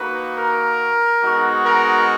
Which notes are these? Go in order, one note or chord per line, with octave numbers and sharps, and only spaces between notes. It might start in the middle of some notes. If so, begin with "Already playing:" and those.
Already playing: A#3 D#4 F#4 B4
A#4
G#3 B3 D#4 F#4
A#4